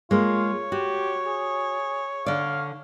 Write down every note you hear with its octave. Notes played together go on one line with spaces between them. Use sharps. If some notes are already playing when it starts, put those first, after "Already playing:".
G#3 A#3 F4 C#5
F#4 G4
G#4
D3 D5 F5